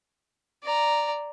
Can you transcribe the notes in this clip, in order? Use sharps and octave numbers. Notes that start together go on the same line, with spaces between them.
D5 A#5